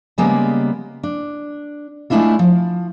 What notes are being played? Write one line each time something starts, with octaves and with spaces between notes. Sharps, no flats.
C#3 G3 G#3 A#3 B3
D4
G#3 A3 C4 D4 E4 F4
F3